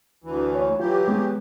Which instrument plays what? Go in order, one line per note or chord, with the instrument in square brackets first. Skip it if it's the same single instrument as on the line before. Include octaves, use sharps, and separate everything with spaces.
[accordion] D2 E3
[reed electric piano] C#5
[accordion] E3 F#3 G4 [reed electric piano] F4
[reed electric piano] G#3 B3